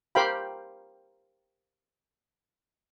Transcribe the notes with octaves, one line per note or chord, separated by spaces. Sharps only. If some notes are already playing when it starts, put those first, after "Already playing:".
G4 A#4 C5 F5 G5 B5